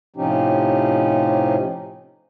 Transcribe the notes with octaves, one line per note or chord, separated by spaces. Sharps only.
A2 C3 F3 C#4 D#4 G4